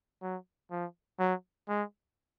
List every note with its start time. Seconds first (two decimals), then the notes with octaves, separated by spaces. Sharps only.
0.22 F#3
0.71 F3
1.19 F#3
1.68 G#3